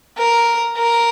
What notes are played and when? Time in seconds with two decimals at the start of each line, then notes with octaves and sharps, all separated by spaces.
0.18 A#4
0.77 A#4